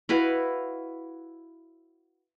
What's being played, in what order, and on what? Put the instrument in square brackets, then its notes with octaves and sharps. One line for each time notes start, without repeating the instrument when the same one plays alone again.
[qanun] E4 F#4 B4 F5